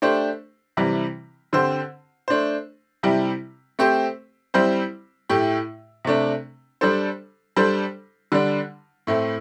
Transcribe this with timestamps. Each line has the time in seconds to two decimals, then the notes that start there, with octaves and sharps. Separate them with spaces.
0.02 A3 D4 G4 C5
0.77 C3 E3 G3
1.53 D3 C4 G4 C5
2.28 A3 D4 C5
3.03 C3 G3 E4 G4
3.79 A3 C4 G4 C5
4.54 G3 C4 E4 C5
5.29 A2 A3 E4 G4
6.05 C3 A3 D4
6.81 G3 D4 A4 C5
7.57 G3 D4 A4 C5
8.32 D3 G3 D4
9.07 A2 A3 C4 E4